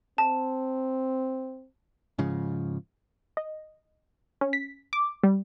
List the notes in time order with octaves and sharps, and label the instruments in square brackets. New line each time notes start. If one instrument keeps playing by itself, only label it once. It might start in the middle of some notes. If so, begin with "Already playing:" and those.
[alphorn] C4 [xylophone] A5
[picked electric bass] G#2 C#3 F3
[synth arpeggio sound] D#5
C#4
B6
D6
G3